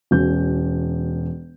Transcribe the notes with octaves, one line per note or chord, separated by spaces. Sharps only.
E1 B2 C#4 G6